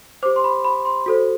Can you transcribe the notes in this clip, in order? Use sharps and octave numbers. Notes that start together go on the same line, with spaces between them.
G4 C5 D6
C6
B5
B5
C6
F#4 A4 C5